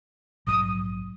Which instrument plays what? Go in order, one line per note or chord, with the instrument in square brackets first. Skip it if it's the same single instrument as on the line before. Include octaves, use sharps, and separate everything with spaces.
[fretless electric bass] A#1 G#2 F#3 [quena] D#6